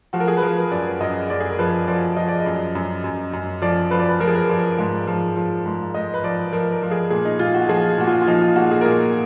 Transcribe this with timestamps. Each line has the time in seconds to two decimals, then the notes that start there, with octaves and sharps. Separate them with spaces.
0.13 F3 F#4
0.20 A#4
0.28 G#4
0.37 B4
0.42 F3 A#4
0.56 B4
0.71 F#2 D5
1.00 F#2 D#5
1.30 F#2 D5
1.40 G#4
1.50 A#4
1.59 F3 B4
1.88 F3 D5
2.17 F3 D#5
2.28 D5
2.40 D#5
2.46 F#2
2.75 F#2
3.04 F#2
3.33 F#2
3.62 F3 D5
3.91 F3 B4
4.00 D5
4.09 B4
4.20 F3 A#4
4.27 G#4
4.35 A#4
4.49 F3 D5
4.79 G#2
5.07 F3
5.36 F3
5.66 G#2
5.94 G#2 D#5
6.14 B4
6.23 F3 D5
6.53 F3 A#4
6.72 A#4
6.82 F3
6.91 G#4
7.10 A#2 G#4
7.25 D#4
7.39 A#2 F4
7.54 F#4
7.69 F3 G#4
7.98 A#2 F#4
8.07 F4
8.22 F4
8.27 F3 D#4
8.41 F4
8.56 A#2 F#4
8.71 G#4
8.81 A#4
8.85 A#2 G#4